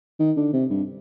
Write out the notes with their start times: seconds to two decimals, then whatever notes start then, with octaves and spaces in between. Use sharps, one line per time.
0.19 D#3
0.37 D3
0.53 C3
0.70 G2